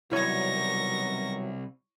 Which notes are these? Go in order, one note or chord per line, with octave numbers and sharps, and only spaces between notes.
C2 B2 D#3 F#3 E4 C#5 C#6 A#6